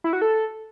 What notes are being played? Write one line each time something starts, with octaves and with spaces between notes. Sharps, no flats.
E4
F#4
A4